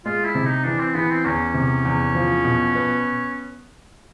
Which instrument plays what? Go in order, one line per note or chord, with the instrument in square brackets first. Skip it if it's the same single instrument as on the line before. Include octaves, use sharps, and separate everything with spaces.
[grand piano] G#3 [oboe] F4
[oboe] E4
[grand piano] C3
[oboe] D#4
[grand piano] E3 [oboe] D4
[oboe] C4
[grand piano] E3 [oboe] B3
[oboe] C4
[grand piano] E2 [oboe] C#4
[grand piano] C3
E2
F3
B2
B3